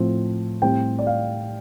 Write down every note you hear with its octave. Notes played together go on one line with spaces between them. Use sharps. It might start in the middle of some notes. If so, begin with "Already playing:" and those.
Already playing: A2 F3 C4
A2 G3 C4 G5
D5
F5